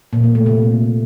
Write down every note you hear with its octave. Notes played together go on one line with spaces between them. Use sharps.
A#2
A#3
A3
C3